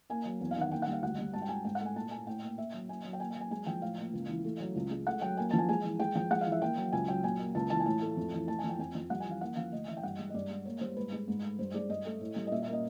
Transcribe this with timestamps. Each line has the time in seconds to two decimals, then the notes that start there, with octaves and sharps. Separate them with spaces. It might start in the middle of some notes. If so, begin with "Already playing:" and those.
0.10 A#3 G#5
0.25 F#3
0.41 E2
0.51 F5
0.56 D#3 F#5
0.71 A#3 G5
0.82 F#5
0.87 G3
0.93 F5
1.02 D2 F#5
1.18 G3
1.33 G#2 A5
1.42 G5
1.49 G#3 G#5
1.65 G#2 G5
1.75 F#5
1.80 A3
1.85 G#5
1.96 A#2 A5
2.11 A#3 G#5
2.27 A2 G5
2.42 A#3
2.58 A#3 E5
2.74 F#3
2.89 A#3 G#5
3.05 F#3
3.13 G5
3.20 A#3 G#5
3.30 G#5
3.36 F#3
3.41 G#5
3.51 G#3 G#5
3.66 F3 G5
3.82 A2 F5
3.98 A#3
4.13 C#2
4.29 E3
4.44 A3
4.60 F#3
4.76 C#2
4.91 G#3
5.06 A3 F#5
5.21 F#3 G5
5.37 A#3 G#5
5.51 A5
5.53 F3
5.59 G#5
5.69 G#3 G#5
5.84 E3
6.00 G#3 G5
6.15 F3 G5
6.30 G#3 F#5
6.41 F5
6.46 E3
6.52 E5
6.61 A#3 G5
6.77 F#3
6.93 C#2 G#5
7.08 F#3 G5
7.24 A#2 G#5
7.40 A#3
7.55 C#2 A5
7.70 E3 A5
7.80 G#5
7.86 A2 A5
8.02 A3
8.17 F2
8.33 E3
8.48 A3 A5
8.59 G#5
8.64 F3
8.69 G5
8.79 F2 G#5
8.95 F3
9.10 G3 F#5
9.20 G#5
9.26 E3 F5
9.41 A#3 F#5
9.56 F3 F5
9.72 D2 D#5
9.88 E3 E5
9.97 G5
10.03 G2 F#5
10.19 G#3
10.29 D#5
10.34 G2 D5
10.50 G#3
10.65 A#3 C#5
10.81 G3 C5
10.96 G#2 B4
11.12 G#3
11.28 G#2
11.43 A3
11.59 G2 C5
11.74 G#3 D5
11.90 G2 D#5
12.05 A3
12.21 A2
12.36 G3
12.47 D#5
12.52 A#2 E5
12.62 E5
12.67 A#3
12.72 D#5